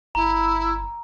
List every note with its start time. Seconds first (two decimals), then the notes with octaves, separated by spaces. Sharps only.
0.15 G1 E4 A#5